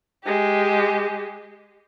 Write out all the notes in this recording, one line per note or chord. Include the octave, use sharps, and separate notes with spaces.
G#3 G4